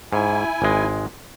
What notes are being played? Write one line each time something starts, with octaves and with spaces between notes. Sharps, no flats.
G#2 E4 G#5
G#1 G#3